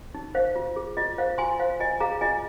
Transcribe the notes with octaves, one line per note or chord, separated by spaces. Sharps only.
D#4
C5 F5
F4
G#4
F4 D#5
C5 F5
F4 G#5 C6
C5 F5
F4 D#5 G#5
G#4 F5 A#5
F4 D#5 G#5